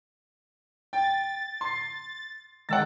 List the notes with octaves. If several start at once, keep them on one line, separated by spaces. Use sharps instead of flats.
G5 A6
C6 C7
D#3 G#3 F#5 G5 E6 A6